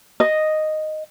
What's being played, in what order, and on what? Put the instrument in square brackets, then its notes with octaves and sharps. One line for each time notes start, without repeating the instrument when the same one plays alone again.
[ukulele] D#5